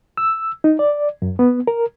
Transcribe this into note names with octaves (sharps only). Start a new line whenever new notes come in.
E6
D#4
D5
F#2
B3
A#4